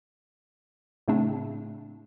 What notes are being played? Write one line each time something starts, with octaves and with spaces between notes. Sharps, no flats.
A2 C#3 A3 C4 D4